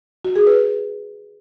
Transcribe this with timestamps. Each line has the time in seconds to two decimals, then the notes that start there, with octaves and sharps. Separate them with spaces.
0.25 F#4
0.36 G#4
0.47 B4